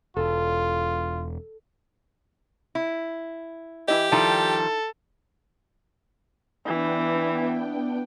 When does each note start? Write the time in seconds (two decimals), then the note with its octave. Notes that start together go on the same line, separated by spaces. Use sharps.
0.17 E1 F4 A4 A5
2.75 E4
3.88 E3 E4 G4 D#5
4.12 D#3 F3 G3 D#4 E4 A4 A5
6.66 E3 B3 D4 G5